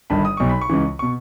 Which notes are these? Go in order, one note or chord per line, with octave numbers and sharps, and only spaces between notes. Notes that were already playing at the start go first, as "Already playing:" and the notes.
G1 G2 D#3 B5
D#6
B1 B2 C#6
B5
C#6
C#2 C#3 E3
B2 C#6